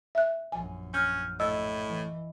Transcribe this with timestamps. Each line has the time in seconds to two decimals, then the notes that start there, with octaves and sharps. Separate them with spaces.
0.15 E5 F#6
0.52 A#1 F#2 G#5
0.94 C#4 F6 G6
1.40 A2 D#5 E6
1.88 E3